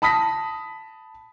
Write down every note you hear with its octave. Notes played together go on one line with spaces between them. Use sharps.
A5 B5 D#6 A#6 B6